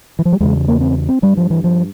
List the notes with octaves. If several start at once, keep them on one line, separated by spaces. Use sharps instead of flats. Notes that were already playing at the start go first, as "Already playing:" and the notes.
E3
F3
G3
E2 C#3 G#3
A#3
C4
C4
G2 G3
F3
E3
F3